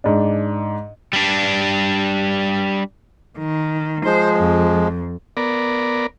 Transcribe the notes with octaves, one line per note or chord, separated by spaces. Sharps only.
G#2 D4
G3 D4
D#3
F3 G#3 C5
F2
B3 A#4 D5